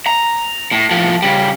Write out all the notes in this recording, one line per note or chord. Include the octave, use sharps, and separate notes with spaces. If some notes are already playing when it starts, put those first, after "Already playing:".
A#5
A2
A2 F3
C#3 G3